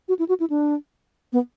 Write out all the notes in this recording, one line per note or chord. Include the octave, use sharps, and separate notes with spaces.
F#4
E4
F#4
E4
D4
B3